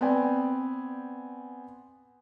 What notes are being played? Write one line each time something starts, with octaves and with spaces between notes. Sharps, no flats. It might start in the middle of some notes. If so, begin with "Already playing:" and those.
B3 C4 D5 G5 G#5